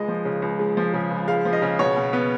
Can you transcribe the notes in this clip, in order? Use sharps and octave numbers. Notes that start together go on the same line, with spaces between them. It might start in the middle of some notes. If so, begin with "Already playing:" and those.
Already playing: C#2 G#3 D#5
F3
C#3
C#2
G#3
F3
C#3
C#2
G#3 F5
F3
D#5
C#3
B2 C#5
B2
B3